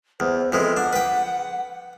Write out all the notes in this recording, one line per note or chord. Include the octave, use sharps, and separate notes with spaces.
E2 C5
F2 E3 G#3 B4
D4 F#5
B4 G5